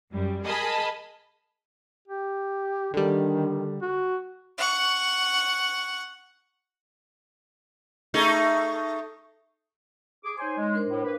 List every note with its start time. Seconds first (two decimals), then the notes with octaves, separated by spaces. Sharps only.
0.12 F#2 G3
0.45 G#4 A#4 D#5 G#5 A5 B5
2.08 G4
2.94 D3 D#3 G3
3.82 F#4
4.58 F#5 C#6
8.14 A3 D#4 G#4
10.24 G#4 D6
10.38 D#4 C5 C#5 G#5 C6
10.57 G#3
10.73 D4 A#4 C5
10.89 A2
11.04 A#3 B4